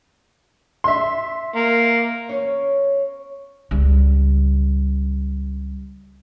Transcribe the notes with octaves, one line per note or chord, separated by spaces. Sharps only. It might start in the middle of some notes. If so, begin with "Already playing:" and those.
E5 C6
A#3
E2 C#4 C#5
C#2 G3